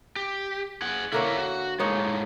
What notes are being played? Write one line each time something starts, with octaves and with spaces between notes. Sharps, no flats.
G4
G#4 F#5
D3 A#3 E4 A#4 C#5 E5
F#4
A2 G#3 A#3 D#4 C#5